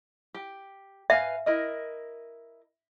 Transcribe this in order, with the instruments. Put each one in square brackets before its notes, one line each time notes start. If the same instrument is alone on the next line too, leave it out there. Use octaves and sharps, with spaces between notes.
[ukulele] G4
[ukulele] B4 F5 G#5 [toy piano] E5
[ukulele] E4 A#4 D#5